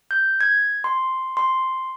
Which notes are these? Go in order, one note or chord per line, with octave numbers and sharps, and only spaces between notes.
G6
G#6
C6
C6